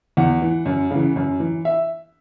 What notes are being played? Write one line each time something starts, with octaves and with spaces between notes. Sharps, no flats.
E2 F#5
E3
F#2
C#3 E3
F#2
E3
E5